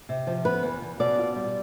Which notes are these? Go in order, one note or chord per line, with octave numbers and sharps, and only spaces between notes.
C3
F3
B3 B4
E2
E2
B2 D5
F4
G3